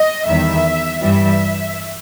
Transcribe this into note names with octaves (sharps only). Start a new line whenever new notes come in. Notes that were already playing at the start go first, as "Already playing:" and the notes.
Already playing: D#5
E2 D#3 G3 E5
G2 E3 G3 E5